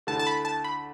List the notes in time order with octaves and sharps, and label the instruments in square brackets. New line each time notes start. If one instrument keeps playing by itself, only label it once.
[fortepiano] D2 D3 A3 E4 [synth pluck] A5
[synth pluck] A5
B5
A5
B5